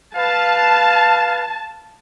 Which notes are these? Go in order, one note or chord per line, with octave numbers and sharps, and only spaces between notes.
B4 F5 A5